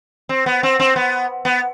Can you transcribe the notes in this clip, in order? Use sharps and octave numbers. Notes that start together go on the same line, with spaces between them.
C4
B3
C4
C4
B3
B3